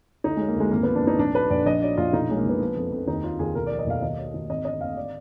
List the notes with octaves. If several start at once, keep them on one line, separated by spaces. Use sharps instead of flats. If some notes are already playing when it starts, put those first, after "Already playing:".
D2 D#4
F#3 G#3
A#3
D2 G#3
G#1 A#3
F3 B3
D4
G#1 D#4
A#1 D4
F#3 B4
A#1 D5
A#1 D#5
F#3 D5
A#1 F4
B1 D#4
F#3 G#3
A#3
B1 B3
F3
F2
F2
D#2 D#4
F#3 F4
D#2 G#4
B1 A#4
F3 D5
D#5
B1 F5
D#2 D#5
F#3
D#2
G#1 D#5
D3 D#5
G#1 F5
D5